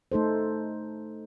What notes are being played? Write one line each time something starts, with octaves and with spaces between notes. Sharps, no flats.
A3 D#4 A4 C5